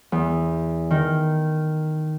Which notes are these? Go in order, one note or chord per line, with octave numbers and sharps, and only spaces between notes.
E2
D#3